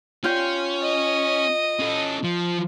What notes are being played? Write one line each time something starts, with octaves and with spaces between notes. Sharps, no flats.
C#4 F4 G5
D#5
C#4 A4
F3